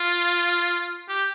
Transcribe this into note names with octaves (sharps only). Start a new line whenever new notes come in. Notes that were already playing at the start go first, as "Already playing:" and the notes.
Already playing: F4
G4